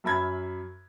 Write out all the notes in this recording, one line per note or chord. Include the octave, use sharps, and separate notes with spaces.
F#2 E5 B5 G#6